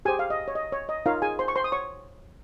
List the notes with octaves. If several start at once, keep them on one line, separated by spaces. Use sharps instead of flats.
G4 G#4 C5 G#5
F5
D#5
C#5
D#5
C#5
D#5
D#4 F4 A#4 C#5 F5
G#4 G#5
C5 C6
C#6
C5 C6
D#6
C#5 C#6